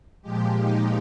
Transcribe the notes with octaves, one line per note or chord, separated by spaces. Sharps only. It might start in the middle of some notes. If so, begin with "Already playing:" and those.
A#2 F3 G#3 G4
D#4